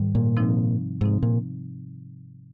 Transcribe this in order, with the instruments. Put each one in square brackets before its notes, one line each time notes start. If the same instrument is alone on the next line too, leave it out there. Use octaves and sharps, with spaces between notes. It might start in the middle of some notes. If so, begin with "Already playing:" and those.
Already playing: [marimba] G#2 D#3 G3
[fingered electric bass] A#2
[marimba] C3 F3 C4 D#4
[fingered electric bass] G#2 [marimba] C3 F3 C4 D#4
[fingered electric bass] A#2